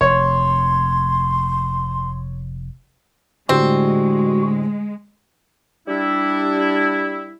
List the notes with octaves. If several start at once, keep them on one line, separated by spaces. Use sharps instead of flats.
F1 C#5 C6
A2 D3 G#3 C4 F#4 G4
G3 D4 E4